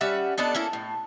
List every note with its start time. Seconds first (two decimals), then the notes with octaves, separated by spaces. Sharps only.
0.01 G3 C#4 E5 F#5
0.38 B3 D4 D#4 A4
0.54 A#3 C#4 E4 A4
0.73 A2